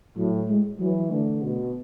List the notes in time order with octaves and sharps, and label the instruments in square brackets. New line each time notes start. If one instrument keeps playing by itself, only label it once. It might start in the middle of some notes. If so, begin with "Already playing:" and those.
[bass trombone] A2 [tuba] F#3
[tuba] G#3
[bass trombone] E3 [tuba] F#3
[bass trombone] D3 [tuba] A3
[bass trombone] B2